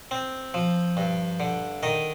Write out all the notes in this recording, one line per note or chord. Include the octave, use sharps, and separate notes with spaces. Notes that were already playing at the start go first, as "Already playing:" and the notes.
C4
F3
G2
D3
D#3 D#5